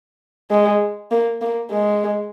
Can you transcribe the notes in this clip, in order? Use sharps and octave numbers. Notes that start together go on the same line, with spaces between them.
G#3
A#3
A#3
G#3